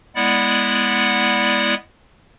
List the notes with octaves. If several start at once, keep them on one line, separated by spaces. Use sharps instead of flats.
G#3 B3 E4 D5 F#5